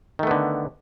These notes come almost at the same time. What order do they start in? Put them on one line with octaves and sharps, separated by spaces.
D#3 A3 B3 D3